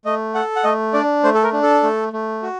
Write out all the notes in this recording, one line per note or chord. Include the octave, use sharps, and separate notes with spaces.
A3 D#5
A4 F#5
F#5
A3 D#5
D4 D5
A3 C5
A4
A#4
D4
A4
A3
A3
F#4